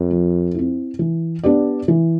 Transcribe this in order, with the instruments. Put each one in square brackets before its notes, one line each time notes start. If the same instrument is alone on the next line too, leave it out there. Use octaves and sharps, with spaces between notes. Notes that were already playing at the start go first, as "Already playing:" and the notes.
Already playing: [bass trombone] F2
[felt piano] F3
C4 E4
E3
B3 D4 G4 D5
E3